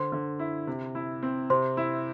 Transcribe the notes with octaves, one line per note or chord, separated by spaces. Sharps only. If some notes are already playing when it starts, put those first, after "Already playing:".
Already playing: D3 C5 C6
D3
E4
C3
E4
C4
C3 C5 C6
E4